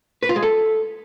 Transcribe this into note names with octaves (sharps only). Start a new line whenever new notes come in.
B4
F4
G#3
A4